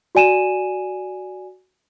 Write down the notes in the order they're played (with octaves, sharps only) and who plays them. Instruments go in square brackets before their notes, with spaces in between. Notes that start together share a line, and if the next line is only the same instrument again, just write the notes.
[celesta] F#4 D5 G#5 D#7 E7